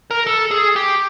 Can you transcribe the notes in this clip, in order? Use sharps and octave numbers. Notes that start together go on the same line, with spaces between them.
A#4
A4
G#4
G4